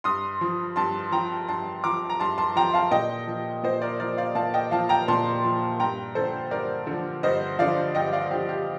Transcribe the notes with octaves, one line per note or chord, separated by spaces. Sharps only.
G2 C6 D#6
F3
G2 A5 C6
F3 G5 A#5
G2 A5 C6
F3 A#5 D6
A#5
G2 A5 C6
A5 C6
F3 G5 A#5
F5 A5
A#2 D#5 G5
F3
A#2 C5 D#5
A#4 D5
F3 A#4 D5
D5 F5
A#2 F5 A5
D#5 G5
F3 F5 A5
G5 A#5
A#2 A5 C6
F3
G2 G5 A#5
D3 F3 A4 C5
G2 A#4 D5
D3 F3
G2 C5 D#5
D3 F3 D5 F5
G2 D#5 G5
D5 F5
D3 F3 G4
G4